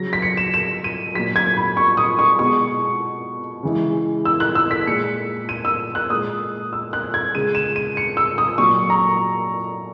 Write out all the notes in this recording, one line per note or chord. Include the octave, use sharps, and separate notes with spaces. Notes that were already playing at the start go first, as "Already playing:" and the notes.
Already playing: C#3 F#3 A#6
B6
C#7
E7
E7
D#7
A#2 F#3 B6
G#6
B5
C#6
D#6
C#6
B2 G#3 C#6
C#3 E3 G#3
E6
F#6
E6
B6
A#2 G#3 C#7
D#7
E6
F#6
A#2 G#3 D#6
E6
F#6
G#6
C#3 G#3 D#7
E7
D#7
C#7
E6
D#6
A#2 F#3 C#6
A#5